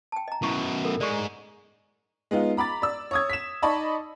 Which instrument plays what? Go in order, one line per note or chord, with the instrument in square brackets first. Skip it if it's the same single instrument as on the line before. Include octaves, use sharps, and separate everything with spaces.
[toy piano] G5 A5
D#5 A#5
[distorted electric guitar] F#2 B2 [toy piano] E4 C#6
[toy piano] A4 A#4
[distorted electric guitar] G#2 G#3 [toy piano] D5 C#6
[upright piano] G#3 B3 D#4 F4
A#5 B5 D6 A6
D5 E6
C#5 D#6 G#6
B6 E7
D#4 D5 D#5 A5 B5 C#6